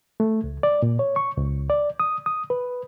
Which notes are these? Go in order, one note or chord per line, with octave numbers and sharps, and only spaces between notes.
A3
C#2
D5
A#2
C#5
C#6
C#2
D5
D#6
D#6
B4